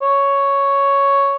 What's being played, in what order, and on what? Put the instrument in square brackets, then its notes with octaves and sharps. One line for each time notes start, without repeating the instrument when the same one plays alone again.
[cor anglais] C#5